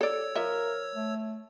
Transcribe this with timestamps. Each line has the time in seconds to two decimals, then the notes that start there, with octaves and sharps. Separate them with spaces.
0.01 A4 C#5 D5 E6
0.35 F3 A#4 E5
0.95 A3